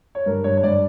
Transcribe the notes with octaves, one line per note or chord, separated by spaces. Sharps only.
C#5
G2 A#4
G2 C#5
C#5
G2 D5